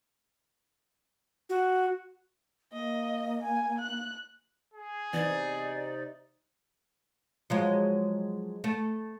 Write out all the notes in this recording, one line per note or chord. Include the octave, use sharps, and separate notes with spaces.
F#4
A#3 D#5
G#5
F#6
G#4
C3 E3 B3 D#4 D5
F3 F#3 G#3
A3